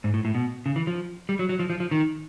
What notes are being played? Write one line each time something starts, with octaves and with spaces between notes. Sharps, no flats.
G#2
A2
A2
B2
C#3
E3
F3
G3
F#3
F#3
F3
F3
F3
D#3